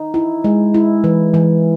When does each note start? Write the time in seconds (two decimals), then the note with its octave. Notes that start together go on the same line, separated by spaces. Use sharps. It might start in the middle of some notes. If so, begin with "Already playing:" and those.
Already playing: D#4
0.14 E4
0.44 G#3
0.74 E4
1.04 E3
1.34 E3